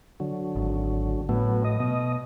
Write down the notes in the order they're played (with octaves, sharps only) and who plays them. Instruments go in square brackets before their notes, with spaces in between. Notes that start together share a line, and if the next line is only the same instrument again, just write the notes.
[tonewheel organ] D3 F#3
[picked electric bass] G#1
[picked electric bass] A2 [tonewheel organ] F#3 B3
[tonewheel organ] D#5
[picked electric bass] B2